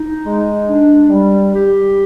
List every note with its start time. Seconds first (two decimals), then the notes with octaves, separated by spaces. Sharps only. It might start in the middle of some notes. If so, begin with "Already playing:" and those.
Already playing: D#4
0.25 G#3
0.67 D4
1.10 G3
1.52 G4